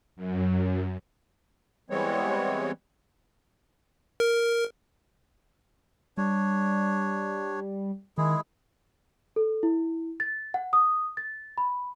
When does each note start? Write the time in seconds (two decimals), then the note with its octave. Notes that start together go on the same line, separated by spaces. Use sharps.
0.16 F#2
1.90 E3 G3 G#3 B3 C4 C#5
4.20 A#4
6.17 G3 D4 C#5
8.18 D#3 G#3 E4 G#4
9.36 A4
9.63 E4
10.20 A6
10.54 F#5
10.73 D#6
11.17 A6
11.58 B5